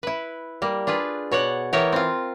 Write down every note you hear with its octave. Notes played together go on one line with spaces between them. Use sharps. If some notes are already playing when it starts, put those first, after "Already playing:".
E4 B4
G3 A#3
D4 F4 G#4 B4
B2 C#5 D5 F#5
E3 B3 E4 A#4 C#5 G5
C4 F4